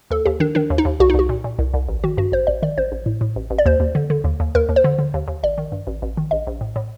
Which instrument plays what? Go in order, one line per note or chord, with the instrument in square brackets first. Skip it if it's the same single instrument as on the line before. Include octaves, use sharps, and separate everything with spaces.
[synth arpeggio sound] D#2 A4
D#2 G4
D#3 D4
D#3 D4
D#2
D#4
D#2
C2 F#4
D#4
C2 F#4
A#2
A#2
C2
C2
A1
D#3 F#4
G2 F#4
A1 C5
A1 D5
D#3 D5
A1 C5
A1
A2
A2
A1
A1
D5
D#2 C5
D#2
D3
D3
D#2
D#2
D#2 A#4
D#2
C5
D3
D3
D#2
D#2
A1 D5
D#3
G2
A1
A1
D#3
A#1 D#5
A#1
A2
A2